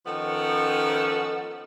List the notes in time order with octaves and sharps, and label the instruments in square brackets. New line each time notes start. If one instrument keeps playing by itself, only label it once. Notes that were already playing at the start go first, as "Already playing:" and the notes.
[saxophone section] D#3 F3 B3 C#4 A4